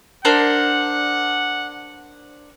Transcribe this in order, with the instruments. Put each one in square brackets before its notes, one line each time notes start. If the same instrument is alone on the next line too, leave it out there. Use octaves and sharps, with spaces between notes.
[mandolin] D4 A#4 C5 [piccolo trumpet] F#5